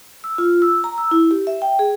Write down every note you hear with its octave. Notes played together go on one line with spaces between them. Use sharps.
E6
F4
E6
A#5
E6
E4
G4
E5
G5
G#4